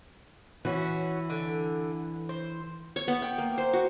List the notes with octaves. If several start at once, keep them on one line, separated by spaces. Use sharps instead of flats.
E3 C#4 F#4
D3
C5
C#5
B3
G5
A#3
C5
F#4